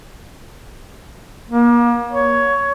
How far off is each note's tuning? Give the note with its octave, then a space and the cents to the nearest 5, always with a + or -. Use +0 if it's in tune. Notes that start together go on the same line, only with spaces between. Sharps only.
A#3 +35
C#5 +10